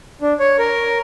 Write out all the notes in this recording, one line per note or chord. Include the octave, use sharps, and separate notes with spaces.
D4
C#5
A#4